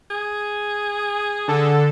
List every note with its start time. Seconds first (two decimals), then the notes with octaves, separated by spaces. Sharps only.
0.10 G#4
1.48 D3 A4